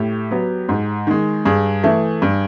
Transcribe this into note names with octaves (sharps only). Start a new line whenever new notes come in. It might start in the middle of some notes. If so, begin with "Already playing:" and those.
Already playing: A2 G4
F#3 B3
G#2
D#3 G#3
G2 G#4
E3 A3
G2